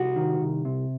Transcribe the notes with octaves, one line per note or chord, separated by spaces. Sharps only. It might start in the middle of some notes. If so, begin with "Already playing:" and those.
Already playing: C2 F#4
D#3
C2
C3